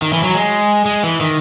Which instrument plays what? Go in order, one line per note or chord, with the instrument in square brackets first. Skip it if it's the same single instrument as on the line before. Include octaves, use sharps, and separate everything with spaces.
[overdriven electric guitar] D#3
E3
F#3
G#3
G#3
E3
D#3